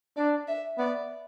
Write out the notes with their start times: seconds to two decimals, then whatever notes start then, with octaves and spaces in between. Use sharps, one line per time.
0.17 D4 D5
0.48 E5
0.78 B3 D5